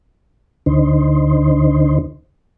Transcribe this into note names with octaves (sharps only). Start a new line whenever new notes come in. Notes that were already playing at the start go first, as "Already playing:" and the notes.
D2 D3 D#4 C5